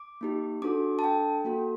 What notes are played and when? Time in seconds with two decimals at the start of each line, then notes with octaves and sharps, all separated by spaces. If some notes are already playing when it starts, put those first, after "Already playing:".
Already playing: D6
0.21 A#3 D#4 G4
0.62 D4 F#4 A4 D6
0.99 A5
1.03 D4 A4 G5
1.45 A#3 F#4 A4